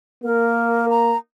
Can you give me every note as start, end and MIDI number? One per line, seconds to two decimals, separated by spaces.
0.24 1.15 58
0.24 0.86 70
0.89 1.17 82